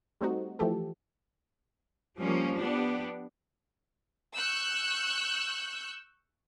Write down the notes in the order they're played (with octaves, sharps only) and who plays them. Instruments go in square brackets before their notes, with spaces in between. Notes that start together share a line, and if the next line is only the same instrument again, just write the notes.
[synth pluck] G3 A3 C4 D#4 F#4
E3 F3 A3 G4 A4
[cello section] F3 G3 A#3 C#4
B3 D4 G4
[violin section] C#6 E6 F#6 G6